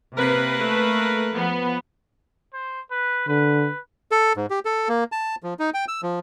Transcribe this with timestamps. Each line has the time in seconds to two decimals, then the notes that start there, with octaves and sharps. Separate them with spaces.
0.18 C3 A#3 A#4 B4
0.58 A3
1.33 F3 B3
2.53 C5
2.91 B4
3.28 D3 B4
4.12 A4
4.37 G#2
4.50 G4
4.65 A4
4.88 A#3
5.12 A5
5.43 F3
5.59 D#4
5.74 G5
5.88 E6
6.03 F3